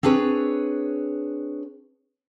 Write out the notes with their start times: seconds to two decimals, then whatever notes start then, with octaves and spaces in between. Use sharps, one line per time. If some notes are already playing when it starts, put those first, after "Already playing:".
0.03 C4 D4 G#4 B4 C#5